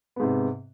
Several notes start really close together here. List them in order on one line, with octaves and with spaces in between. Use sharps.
B3 G#2 C3